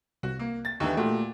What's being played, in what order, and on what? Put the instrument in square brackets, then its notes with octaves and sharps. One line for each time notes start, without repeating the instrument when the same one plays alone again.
[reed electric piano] C2 [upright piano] F#4
[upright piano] A#3
A6
[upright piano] D#2 D3 E3 [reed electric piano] D#4 C#6
[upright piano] A#2 [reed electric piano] A3 F#4 G4